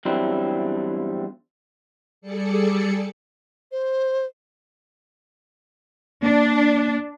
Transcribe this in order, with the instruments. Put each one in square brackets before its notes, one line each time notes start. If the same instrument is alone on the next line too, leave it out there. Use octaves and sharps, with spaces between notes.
[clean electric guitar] E2 G2 F#3 G3 C4 E4
[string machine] G3 G#4 A4 D5 C#7
[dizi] C5
[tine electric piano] A#3 [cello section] D4